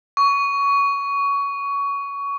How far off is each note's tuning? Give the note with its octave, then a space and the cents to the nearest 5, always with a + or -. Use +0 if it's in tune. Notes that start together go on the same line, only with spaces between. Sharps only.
C#6 +20